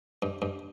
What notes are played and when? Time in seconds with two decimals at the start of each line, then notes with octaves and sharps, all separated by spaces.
0.22 G2
0.42 G2